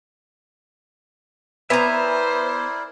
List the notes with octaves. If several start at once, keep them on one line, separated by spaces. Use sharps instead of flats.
B3 E4 A#4 C5 D5 E5 G#5 A#5